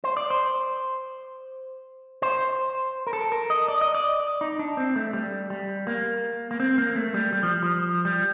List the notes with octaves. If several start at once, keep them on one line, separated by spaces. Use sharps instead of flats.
C5
D5
C5
C5
A#4
A4
A#4
D#5
D5
D#5
D5
D#4
D4
C4
A3
G3
G3
A#3
A#3
C4
A#3
A3
G3
G3
F3
F3
G3